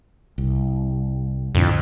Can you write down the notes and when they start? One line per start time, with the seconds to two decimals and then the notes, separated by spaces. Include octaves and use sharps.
0.38 C2
1.55 F2 A2 D3 D4